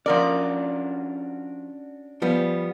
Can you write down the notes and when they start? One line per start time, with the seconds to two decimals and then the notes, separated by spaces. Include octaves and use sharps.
0.06 F3 C#4 D4 F#4 A#4 D5
2.22 F3 G3 B3